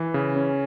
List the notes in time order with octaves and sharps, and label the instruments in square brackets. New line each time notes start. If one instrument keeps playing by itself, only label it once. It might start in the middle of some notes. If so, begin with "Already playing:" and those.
Already playing: [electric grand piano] E3
C#3
C#4